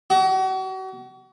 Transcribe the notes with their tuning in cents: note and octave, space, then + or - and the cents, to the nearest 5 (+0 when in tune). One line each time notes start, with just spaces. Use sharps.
F#4 +40